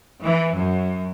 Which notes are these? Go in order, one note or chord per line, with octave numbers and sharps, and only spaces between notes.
E3
F#2